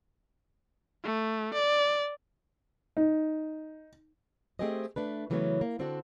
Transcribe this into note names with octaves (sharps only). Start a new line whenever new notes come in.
A3
D5
D#4
A3 C4 G4 G#4 C5 D#5
A3 D4 B4
C#3 E3 F#3 A3 B3 C#4
A#3
D3 C4 D4 F#4 A4